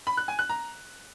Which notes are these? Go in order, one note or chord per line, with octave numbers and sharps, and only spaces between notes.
B5
F#6
G#5
F#6
A#5